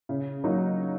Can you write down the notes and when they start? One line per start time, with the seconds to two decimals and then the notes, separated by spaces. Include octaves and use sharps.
0.09 C#3
0.44 F#3 A#3 D#4